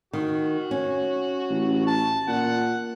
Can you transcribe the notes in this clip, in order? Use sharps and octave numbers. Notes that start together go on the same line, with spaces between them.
D#3 F#4
C#4
A1
A5
A#2 F#5